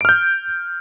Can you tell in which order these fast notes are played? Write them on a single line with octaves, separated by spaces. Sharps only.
D7 F6 G6